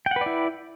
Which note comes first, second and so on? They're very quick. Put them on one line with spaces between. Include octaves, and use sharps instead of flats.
G5 F#5 B4 D5 E4